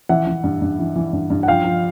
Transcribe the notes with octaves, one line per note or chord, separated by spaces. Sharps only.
E3 E5 F#5
E3
G2
G2
E3
E3
G2
G2
F#5
F3 F5 G5
F3